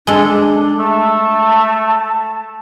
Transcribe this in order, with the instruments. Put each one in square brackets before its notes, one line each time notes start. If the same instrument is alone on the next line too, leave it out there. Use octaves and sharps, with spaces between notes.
[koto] G#3 A4 [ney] D4
[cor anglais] A3 [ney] A5